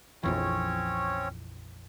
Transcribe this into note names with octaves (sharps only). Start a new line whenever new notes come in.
A#1 F2 E3 C4 C#4 C#5